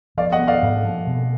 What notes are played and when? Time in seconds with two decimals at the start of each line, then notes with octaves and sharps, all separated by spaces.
0.17 F3 D5 F5
0.32 D#5 F#5
0.39 B3
0.47 D5 F5
0.62 G#2
0.84 F3
1.07 B2